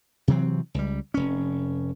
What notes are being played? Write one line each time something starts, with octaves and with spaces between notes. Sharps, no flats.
C3 E3 F#3 C4
C#2 G3
F1 C#4